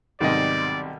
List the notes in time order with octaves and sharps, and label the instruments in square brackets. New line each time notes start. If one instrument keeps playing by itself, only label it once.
[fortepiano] B1 C3 G3 [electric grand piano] G#2 D#5 [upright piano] D#3 [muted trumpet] D5